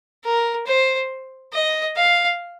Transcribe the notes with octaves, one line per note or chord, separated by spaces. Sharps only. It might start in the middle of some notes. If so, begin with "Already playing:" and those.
A#4
C5
D#5
F5